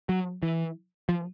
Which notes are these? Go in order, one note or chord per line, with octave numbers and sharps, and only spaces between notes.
F#3
E3
F3